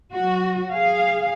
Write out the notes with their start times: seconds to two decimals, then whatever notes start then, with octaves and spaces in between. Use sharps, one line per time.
0.13 F#3 F#4
0.72 G#4 F5